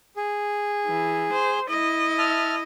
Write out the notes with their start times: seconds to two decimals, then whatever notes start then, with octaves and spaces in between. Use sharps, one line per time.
0.16 G#4
0.86 E3
1.32 C5
1.69 E4 D#5
2.18 E5 A5 F6